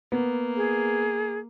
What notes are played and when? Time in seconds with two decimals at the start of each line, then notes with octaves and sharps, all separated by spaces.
0.12 A#3 B3
0.56 G#4